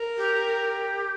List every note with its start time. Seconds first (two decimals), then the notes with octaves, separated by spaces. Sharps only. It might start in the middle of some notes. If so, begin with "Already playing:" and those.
Already playing: A#4
0.17 G4